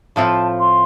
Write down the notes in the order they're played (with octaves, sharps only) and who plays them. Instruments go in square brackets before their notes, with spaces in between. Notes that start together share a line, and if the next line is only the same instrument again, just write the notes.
[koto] A2 F3 C4 F4 [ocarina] A5
[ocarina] C6